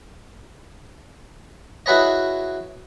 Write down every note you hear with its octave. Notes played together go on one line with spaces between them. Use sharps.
E4 F#4 G#4 B4 C#5 D#5